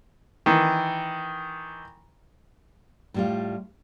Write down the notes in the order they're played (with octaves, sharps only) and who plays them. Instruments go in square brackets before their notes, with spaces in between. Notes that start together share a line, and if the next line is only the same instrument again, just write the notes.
[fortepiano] D#3 E3
[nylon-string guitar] A2 G3 F4